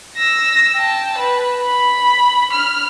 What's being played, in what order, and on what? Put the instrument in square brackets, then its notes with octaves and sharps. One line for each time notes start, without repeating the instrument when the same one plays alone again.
[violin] E6 A#6
G5 A5
B4
B5
F6